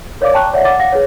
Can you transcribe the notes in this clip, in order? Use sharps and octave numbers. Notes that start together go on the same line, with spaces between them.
A#4 C#5 D5 F5 D6
G5 A5 A#5 C#6 F#6
C#5 D5 E5 F#5
D5 F#5 D6 A6
F5 F#5 A#6
G#4 B4 C#5